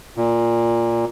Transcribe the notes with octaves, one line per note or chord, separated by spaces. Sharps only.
A#2